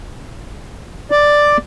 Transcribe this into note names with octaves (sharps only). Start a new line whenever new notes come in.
D5